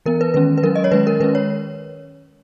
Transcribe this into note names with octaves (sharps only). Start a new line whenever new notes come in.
E3 B3 A#4
B4
D#3 G#3 C#4 B4
B4
F#3 C#4 A#4
D#5
C#5
D#3 G#3 C#4 B4
A#4
D#3 G#3 C#4 B4
C#5